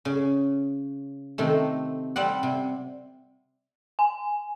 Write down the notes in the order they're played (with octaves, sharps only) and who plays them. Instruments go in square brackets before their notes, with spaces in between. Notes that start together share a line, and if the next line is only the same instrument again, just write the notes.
[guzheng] C#3
C3 D#3 A3
G3 C4 D5 F#5
C3
[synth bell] G#5